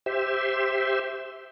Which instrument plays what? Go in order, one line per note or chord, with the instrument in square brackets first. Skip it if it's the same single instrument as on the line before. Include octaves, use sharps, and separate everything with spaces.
[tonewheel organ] G4 C5 E5